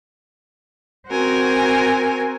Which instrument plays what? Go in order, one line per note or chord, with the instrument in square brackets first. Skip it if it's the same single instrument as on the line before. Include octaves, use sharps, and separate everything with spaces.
[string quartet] C4 F#4 A#4 G#5